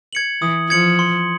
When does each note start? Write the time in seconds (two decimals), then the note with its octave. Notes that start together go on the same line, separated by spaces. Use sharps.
0.13 G#6 C#7 F#7
0.42 E3 D#6
0.70 F3 G#6 C#7 F#7
0.99 C6